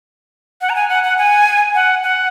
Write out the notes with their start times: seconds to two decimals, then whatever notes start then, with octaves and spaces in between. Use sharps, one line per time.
0.61 F#5
0.70 A#5
0.76 G#5
0.89 F#5
1.04 F#5
1.18 G#5
1.75 F#5
2.04 F#5